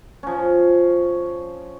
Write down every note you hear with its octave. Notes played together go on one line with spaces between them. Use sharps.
F3 C#4